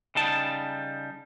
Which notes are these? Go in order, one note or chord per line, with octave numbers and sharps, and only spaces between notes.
C#3 G3 D#4 A5